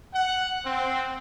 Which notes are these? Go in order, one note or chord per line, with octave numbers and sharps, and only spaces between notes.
F#5
C4